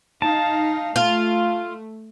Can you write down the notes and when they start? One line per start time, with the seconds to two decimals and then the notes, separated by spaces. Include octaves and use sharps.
0.22 D#4 F5 A5
0.96 A3 F4